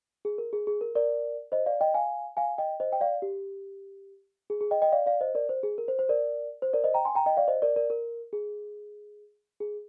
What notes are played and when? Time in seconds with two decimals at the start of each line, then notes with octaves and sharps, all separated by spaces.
0.25 G#4
0.38 A#4
0.53 G#4
0.67 G#4
0.81 A#4
0.95 A#4 D5
1.52 C5 D#5
1.66 D5 F5
1.81 D#5 G5
1.94 F5 G#5
2.37 F5 G#5
2.58 D#5 G5
2.80 C5 D#5
2.92 G5
3.01 D5 F5
3.22 G4
4.50 G#4
4.61 G#4
4.71 D#5 G5
4.82 D#5 G5
4.92 D5 F5
5.06 D5 F5
5.21 C5 D#5
5.35 A#4 D5
5.49 C5
5.63 G#4
5.78 A#4
5.88 C5
5.99 C5
6.09 A#4 D5
6.62 C5
6.73 A#4 D5
6.84 C5 D#5
6.94 G5 A#5
7.05 G#5 C6
7.15 G5 A#5
7.26 D#5 G5
7.37 D5 F5
7.48 C5 D#5
7.62 A#4 D5
7.76 A#4 D5
7.90 A#4
8.33 G#4
9.60 G#4